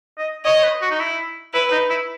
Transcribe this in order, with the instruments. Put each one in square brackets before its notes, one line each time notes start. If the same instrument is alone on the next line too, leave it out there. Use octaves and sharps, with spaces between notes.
[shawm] D#5
[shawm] C#5 [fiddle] D#5
[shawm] C#5
B4
F#4
D#4
E4
[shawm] E4 [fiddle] B4
[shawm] D#4
E4